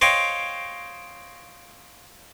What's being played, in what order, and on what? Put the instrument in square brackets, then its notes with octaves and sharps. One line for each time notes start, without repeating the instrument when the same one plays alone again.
[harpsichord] C5 C#5 D#5 F5 G5